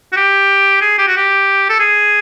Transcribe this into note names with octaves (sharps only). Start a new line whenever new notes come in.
F#4
G4
G#4
G4
F#4
G4
A4
G#4